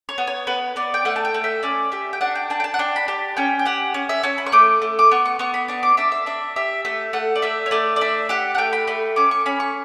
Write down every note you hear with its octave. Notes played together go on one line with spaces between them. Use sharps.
C#5
B3
C#5
B3 B4
B3 D5
G5
A3 F#5
A5
G5
A3
E5
C#4 D5
G4 E5
G5
D4 F#5
G5
D4 A5
G5
A5
F#5
D4 G5
B5
G4 A5
C#4 G5
G5
G4 F#5
C#4
E5
C#4 A5
B5
C#6
A3 D6
A3
D6
B3 C#6
C#6
B3 C#6
B5
D4 C#6
D6
D4 E5
E5
D4 E5
G4 E5
A3 E5
A3 F#5
D5
A3 E5
C#5
A3 D5
D5
D4 E5
G4 F#5
F#5
A3 G5
B5
A3 B5
C#4 D6
C#6
C#4 B5
C#6